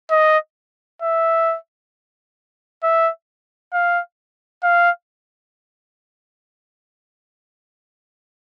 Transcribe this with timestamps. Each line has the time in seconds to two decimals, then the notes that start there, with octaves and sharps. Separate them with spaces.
0.11 D#5
1.02 E5
2.83 E5
3.73 F5
4.63 F5